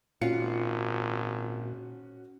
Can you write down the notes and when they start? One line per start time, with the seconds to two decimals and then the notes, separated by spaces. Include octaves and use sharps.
0.21 G#1 A#2 C#4 F4 F#4 C#7